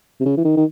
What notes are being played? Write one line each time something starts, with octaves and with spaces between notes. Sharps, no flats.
C3
C#3
E3
D#3
D#3